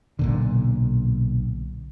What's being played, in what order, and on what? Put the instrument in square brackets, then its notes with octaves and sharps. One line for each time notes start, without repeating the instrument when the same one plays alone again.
[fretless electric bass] B1 A#2 D3